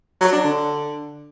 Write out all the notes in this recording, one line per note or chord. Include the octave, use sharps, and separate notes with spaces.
F#3
D4
D3